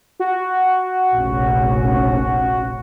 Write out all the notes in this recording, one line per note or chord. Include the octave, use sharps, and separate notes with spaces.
F#4
F1 A#1 C#4